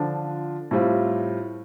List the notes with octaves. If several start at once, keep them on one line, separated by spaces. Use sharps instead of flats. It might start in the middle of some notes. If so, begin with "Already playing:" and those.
Already playing: D3 F3 D4 F4
A2 G3 C4 F4